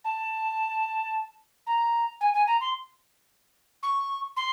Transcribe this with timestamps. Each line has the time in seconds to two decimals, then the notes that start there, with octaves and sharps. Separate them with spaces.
0.04 A5
1.66 A#5
2.20 G#5
2.33 G#5
2.47 A#5
2.60 C6
3.82 C#6
4.36 C6